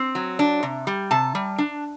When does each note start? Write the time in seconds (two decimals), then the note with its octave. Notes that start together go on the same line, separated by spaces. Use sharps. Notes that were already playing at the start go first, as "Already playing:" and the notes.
Already playing: C4
0.15 F#3
0.39 D4
0.63 C3
0.87 G3
1.11 C3 A5
1.35 G3
1.58 D4